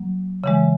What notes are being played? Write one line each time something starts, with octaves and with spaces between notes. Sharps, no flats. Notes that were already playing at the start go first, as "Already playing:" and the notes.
Already playing: F#3 A#3
C#3 E3 G#3